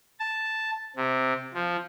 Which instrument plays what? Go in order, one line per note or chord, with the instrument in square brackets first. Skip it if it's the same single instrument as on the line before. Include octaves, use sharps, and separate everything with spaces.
[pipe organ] A5
C3
F3